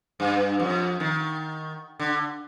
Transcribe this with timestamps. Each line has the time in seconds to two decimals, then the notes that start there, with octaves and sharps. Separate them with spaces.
0.20 G2
0.60 F2
1.00 D#3
1.99 D3